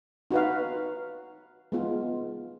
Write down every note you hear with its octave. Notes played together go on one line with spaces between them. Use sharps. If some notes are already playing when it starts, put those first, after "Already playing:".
D#4 F#4 B4 F5
G#3 B3 F4